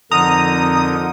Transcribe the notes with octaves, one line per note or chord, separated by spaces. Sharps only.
F2 D3 D#4 A#4 A#5 D#6